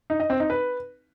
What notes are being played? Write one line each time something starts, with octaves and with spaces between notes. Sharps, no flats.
D#4
D#5
C4
D#4
B4